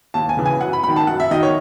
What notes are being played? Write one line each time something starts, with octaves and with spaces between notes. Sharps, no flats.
D#2 A5
G#5
C#3 E3
G#5
F#2 F#5
B5
D#3 F#3 B5
A5
F#2 F#5
E5
D#3 F#3 D#5
C#5